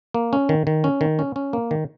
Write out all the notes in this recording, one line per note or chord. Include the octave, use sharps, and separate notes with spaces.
A#3
C#4
D#3
D#3
C#4
D#3
C#4
C#4
A#3
D#3